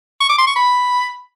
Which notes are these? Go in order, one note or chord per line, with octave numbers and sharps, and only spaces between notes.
C#6
D6
C6
C#6
B5